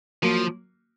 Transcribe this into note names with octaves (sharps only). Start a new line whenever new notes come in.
F3 F#3 A#3